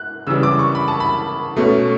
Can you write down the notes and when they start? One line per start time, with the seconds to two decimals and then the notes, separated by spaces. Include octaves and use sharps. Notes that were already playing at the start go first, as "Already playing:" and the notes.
Already playing: F#6
0.27 C#3 E3 G3 E6
0.43 D6
0.59 C#6
0.75 B5
0.88 A5
1.00 B5
1.56 B2 A3 C#4